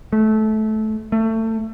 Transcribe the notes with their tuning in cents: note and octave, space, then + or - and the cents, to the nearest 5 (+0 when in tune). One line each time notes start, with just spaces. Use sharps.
A3 -20
A3 +25